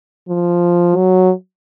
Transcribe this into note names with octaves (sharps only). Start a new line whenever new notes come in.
F3
F#3